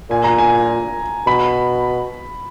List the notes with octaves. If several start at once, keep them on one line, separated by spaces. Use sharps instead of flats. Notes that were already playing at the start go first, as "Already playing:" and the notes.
A#2 G#5
A#5
G#5
B2 B5